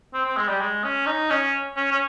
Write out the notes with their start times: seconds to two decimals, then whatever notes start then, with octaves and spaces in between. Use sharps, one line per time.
0.14 C4
0.25 C4
0.37 G#3
0.48 G3
0.61 G#3
0.84 C#4
1.06 D#4
1.30 C#4
1.76 C#4
1.92 C#4